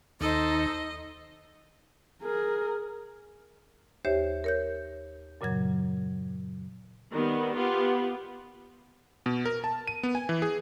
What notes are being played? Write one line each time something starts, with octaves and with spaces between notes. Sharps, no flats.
D#2 D#4 A4 C5 D#5
G#4 A#4
D#2 G4 C5 C#5 E5
A#4 C#5 G6
F#2 A#2 C#3 F#3 G#6
D#3 G3 B3
B3 F4 G4
B2
A#4
A5
D#7
B3
G#5
E3
G#4